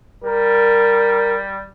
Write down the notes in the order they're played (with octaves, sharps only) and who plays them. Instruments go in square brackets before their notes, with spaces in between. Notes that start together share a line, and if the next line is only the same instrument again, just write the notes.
[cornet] G3 [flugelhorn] A#4